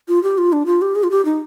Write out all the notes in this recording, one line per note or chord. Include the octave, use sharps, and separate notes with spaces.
F4
G4
F4
D4
F4
G4
G#4
F4
G4
D#4